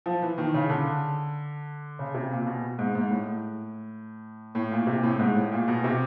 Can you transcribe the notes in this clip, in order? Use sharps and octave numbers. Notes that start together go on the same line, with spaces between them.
F3
E3
D#3
C#3
D3
C#3
C3
A#2
B2
G#2
G#2
A2
A2
A#2
C3
A2
G#2
A2
A#2
B2
C3